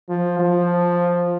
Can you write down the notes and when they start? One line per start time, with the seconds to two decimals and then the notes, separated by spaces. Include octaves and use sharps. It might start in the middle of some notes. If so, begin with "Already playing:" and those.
0.09 F3
0.39 F3